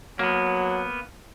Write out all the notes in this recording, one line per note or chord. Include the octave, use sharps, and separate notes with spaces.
F#3 A#3 B3